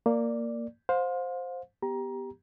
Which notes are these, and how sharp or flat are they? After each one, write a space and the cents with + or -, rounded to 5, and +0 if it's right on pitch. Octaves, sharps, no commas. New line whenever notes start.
A#3 -10 D5 +0
C5 +0 F5 +35
B3 +0 G4 +0 A#5 +20